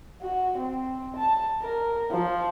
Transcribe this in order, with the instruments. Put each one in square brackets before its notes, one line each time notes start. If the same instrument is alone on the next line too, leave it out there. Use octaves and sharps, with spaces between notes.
[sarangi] F#4
C4
A5
A#4
F3